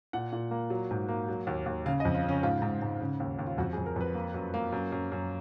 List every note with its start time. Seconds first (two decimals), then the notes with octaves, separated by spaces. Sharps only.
0.13 A#2 F#5
0.32 A#2
0.51 A#3
0.70 F#3
0.91 G#2
1.09 A#3
1.28 F#3
1.47 D#2
1.66 D#2
1.86 C#3 F5
2.00 D#5
2.05 F2
2.15 F4
2.23 C#3
2.29 C#4
2.43 G#2 F4
2.62 G#2
2.82 G#2
3.01 C#3
3.20 D#2
3.39 D#2
3.47 F4
3.58 F2 F#4
3.73 G#4
3.78 F2
3.86 A#4
3.96 F2 B4
4.15 A#3
4.34 F#2
4.54 A#3
4.72 F#2
4.92 F#2
5.12 F#2